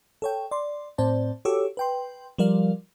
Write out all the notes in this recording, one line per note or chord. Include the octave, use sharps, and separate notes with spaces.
A4 C#5 G5
D5 C6
A2 C4 C5 D5 A5
F#4 G4 A4 C#5 D6 E6
B4 G5 C6
F3 G3 A#4 D5 F5